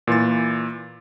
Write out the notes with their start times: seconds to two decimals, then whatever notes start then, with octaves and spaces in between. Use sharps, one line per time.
0.07 A#2 E3 C6 A6